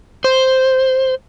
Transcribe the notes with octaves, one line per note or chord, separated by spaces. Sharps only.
C5